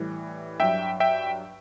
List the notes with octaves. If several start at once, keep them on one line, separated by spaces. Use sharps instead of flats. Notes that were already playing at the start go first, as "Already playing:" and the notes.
Already playing: A2 E3 G3
G2 F#3 E5 G5
E5 G5